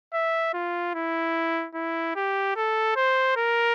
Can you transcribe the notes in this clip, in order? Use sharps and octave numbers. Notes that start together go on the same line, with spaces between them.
E5
F4
E4
E4
G4
A4
C5
A#4